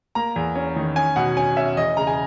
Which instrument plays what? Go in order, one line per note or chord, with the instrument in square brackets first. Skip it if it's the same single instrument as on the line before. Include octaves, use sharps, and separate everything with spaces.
[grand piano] A#3 A#5
E2
C#4
D#3
C#4 G#5
B2 F#5
C#4 G#5
C#4 E5
E2 D#5
C#3 A#5
G#5